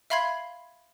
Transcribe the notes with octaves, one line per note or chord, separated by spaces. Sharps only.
E5 F5 B5 C6 G#6 C7